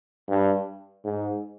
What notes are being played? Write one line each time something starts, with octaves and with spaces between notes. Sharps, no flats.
G2
G#2